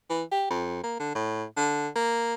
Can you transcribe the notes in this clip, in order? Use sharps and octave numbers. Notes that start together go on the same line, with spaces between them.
E3
G4
F2
A#3
D3
A2
D3
A#3